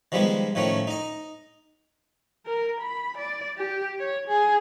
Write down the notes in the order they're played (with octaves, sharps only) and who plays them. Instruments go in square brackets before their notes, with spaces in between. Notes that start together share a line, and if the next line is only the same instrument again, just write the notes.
[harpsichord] D#3 F3 G3 G#3 B3
A2 D#3 F3 A3 C#4
D#4 D#5
[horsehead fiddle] A#4
B5
D5
G4
C#5
G#4